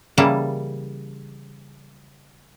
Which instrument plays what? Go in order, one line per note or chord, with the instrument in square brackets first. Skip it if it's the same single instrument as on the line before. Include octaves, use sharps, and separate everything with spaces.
[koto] C#3 E3 G3 A#3 E4 A5